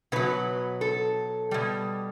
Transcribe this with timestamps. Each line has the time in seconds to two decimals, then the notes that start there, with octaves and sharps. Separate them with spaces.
0.12 B2 F#3 B4
0.81 A4
1.51 B2 G3